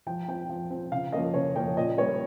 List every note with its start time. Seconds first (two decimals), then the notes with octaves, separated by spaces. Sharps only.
0.07 F3 G5
0.28 C4 G5
0.49 F3
0.71 C4
0.92 C#3 F5
1.13 F3 A#3 C#4 D#5
1.34 C#3 C#5
1.55 F3 A#3 C#4 G5
1.77 A#2 D#5
1.98 G3 A#3 C#4 C#5